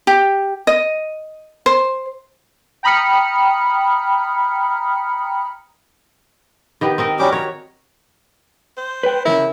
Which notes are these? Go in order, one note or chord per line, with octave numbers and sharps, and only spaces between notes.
G4
D#5
C5
G5 A#5 B5 D#6 F6 C#7
D#3 B3 G4
C4 D#4 A#4
G3 C#4 F#4 G4 D6
C#5 A#5
C5
B4 G5
C#3 E3 E4 A#4